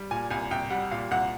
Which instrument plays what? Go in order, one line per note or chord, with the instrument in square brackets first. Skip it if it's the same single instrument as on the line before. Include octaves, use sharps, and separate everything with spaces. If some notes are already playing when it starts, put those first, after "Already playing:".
Already playing: [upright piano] G3
A#2 G#5
C2 G#5
C2 G5
G3 F#5
A#2 F5
C2 F#5